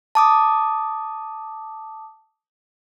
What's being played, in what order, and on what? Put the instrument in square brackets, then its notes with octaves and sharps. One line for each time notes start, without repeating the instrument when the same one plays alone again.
[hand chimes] A5 D6 D#6